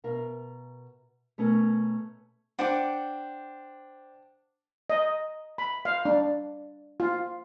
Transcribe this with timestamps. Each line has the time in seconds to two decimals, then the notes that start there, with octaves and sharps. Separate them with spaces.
0.04 B2 A#4 E5
1.38 B2 A3 C#4 A#4
2.59 D4 C5 F#5 G5 D6
4.90 D#5
5.58 B5
5.85 F5
6.05 D4
7.00 F4